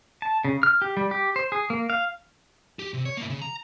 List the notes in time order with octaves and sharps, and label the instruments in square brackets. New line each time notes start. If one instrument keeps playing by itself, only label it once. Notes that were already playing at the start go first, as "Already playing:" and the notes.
[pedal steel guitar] A5
C#3
F6
G4
G3
G4
C5
G#4
A#3
F5
[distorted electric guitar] G4
C3
C#5
A#3 E4
C#3
A#5